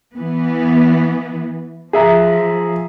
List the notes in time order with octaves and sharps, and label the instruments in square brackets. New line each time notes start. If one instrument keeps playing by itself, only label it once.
[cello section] E3 B3
[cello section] F3 [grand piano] G#4 E5 A#5